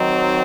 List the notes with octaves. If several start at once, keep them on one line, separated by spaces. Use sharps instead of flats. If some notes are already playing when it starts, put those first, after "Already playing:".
Already playing: D#3 F#3 C4 D#4